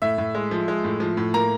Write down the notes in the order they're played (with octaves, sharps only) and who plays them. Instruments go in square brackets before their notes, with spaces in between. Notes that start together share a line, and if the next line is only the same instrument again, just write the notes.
[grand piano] A2 E5
A2
G#3
F3
G#3
A2
F3
A2
A#3 A#5